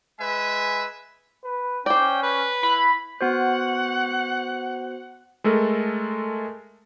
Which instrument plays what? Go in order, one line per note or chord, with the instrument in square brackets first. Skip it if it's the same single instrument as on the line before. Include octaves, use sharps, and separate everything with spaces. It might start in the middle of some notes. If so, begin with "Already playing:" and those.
[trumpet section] G#3 B4 G#5 [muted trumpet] E5
[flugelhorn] B4
[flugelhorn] C#4 [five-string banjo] C5 D5 [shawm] G5
[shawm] B4
[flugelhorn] E4 [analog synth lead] B5
[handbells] B3 F#4 C5 [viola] F#5
[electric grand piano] G#3 A3 A4 A#4